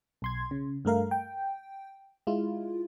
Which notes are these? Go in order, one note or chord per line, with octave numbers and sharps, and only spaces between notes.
B1 C6 G#6
C#3
G2 A3 A#4 F5
G5
G#3 E4 F4